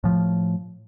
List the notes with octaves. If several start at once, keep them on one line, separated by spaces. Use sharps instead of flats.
A2 F3